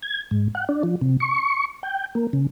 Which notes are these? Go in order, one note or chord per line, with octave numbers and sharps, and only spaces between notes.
G#6
G#2
F#5
D4
F3
C3
C#6
G5
A#3
C#3